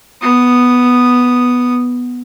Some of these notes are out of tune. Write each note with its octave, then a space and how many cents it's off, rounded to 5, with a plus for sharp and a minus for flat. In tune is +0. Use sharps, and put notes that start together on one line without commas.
B3 +0 D#6 -10